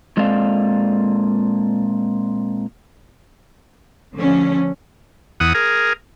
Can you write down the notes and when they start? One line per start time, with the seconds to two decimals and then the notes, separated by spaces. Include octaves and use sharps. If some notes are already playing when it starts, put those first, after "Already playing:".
0.17 A#2 G#3 C4 A4 D5 F5
4.15 D3 F3 A3 C#4
5.40 E2 F#5 D#6
5.54 G#4 A#4